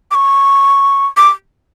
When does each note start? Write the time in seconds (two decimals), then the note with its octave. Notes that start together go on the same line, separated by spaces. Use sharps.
0.11 D6
0.15 C#6
1.17 D6